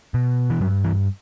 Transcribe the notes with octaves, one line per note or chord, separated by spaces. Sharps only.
B2
E3
G2 F#3
E3